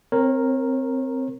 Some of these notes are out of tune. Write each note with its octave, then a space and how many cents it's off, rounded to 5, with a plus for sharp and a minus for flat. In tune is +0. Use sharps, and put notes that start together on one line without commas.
C4 +0 A#4 +0 C#5 -35